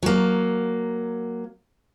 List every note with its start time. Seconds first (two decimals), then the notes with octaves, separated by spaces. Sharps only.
0.03 F#3 A#3